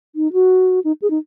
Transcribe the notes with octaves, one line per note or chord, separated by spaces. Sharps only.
D#4
F#4
D#4
G#4
D#4